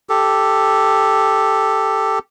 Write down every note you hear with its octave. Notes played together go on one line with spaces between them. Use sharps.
G4 A4